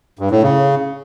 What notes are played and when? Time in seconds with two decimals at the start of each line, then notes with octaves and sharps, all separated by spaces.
0.19 G2
0.31 A2
0.43 C#3